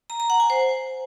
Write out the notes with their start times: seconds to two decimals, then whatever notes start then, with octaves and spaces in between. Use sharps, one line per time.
0.10 A#5
0.20 A#5
0.30 F#5
0.40 G#5
0.50 C5